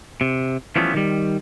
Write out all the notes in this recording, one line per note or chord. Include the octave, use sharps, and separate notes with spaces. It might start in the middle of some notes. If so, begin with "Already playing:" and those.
C3
E3 F3 G3 A3 B3 C#4
D#3 G3